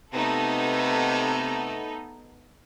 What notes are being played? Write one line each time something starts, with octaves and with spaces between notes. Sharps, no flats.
C3 A3 B3 D#4 A4